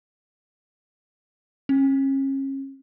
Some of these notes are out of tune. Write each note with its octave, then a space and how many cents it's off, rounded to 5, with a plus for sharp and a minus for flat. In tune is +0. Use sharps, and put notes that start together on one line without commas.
C#4 -35